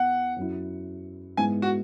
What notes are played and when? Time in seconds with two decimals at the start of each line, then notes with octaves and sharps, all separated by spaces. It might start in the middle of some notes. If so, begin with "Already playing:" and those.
Already playing: E2 E3 B3 F#5
0.36 F#2 F#3 E4
1.37 G#2 G#3 B3 E4 G#5
1.62 F#4